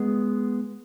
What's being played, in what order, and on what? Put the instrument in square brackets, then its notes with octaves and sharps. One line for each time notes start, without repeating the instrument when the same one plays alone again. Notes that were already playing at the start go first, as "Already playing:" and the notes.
Already playing: [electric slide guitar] G#3 B3